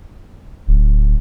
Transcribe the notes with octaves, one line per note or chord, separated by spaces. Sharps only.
D1